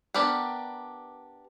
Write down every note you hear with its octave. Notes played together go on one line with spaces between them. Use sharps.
B3 D4 G4 A#4 B4